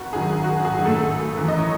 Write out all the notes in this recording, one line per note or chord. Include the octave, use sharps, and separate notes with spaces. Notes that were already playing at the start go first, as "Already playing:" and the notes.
Already playing: G#1 F#4
F#2 D#3 F#3 G#4
G#1 F#4
G#4
F#2 D#3 F#3
A3 A4
G#1
F#2 E3
D#5
C#5